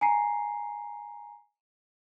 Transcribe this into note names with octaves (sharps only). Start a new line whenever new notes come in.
G#5 A#5 C7